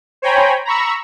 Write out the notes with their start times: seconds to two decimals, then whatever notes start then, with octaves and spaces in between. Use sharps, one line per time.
0.22 C5 C#5 G5 G#5 A#5 B5
0.65 A#5 B5 C#6 E6